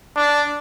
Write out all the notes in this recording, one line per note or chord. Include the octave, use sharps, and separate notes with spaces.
D4